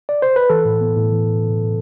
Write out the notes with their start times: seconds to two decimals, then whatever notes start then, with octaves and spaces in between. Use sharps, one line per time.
0.09 D5
0.22 C5
0.36 B4
0.50 E3 A4
0.65 A2
0.81 B3
0.96 A2
1.12 E3